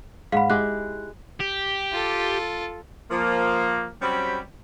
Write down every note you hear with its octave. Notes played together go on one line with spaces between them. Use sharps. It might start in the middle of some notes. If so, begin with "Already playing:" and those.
G#2 F5 F#5 B5
G#3 E4 G4 F#6
G4
F4 A4
F3 A#3
F#3 G3 C4 C#4 G4 B5